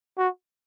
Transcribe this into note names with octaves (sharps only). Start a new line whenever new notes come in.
F#4